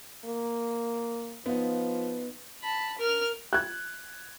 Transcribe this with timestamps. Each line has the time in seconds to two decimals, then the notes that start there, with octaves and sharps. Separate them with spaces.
0.25 A#3
1.46 F3 B3 D#4 F4
2.62 A5 B5
2.98 A#4 F6
3.53 F#6 G#6